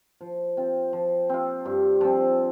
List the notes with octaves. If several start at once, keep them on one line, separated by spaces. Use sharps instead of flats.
F3
C4 F4
F3
C4 F4
G2
F3 C4